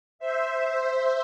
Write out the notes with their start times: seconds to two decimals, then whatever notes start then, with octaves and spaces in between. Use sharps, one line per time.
0.19 C5 E5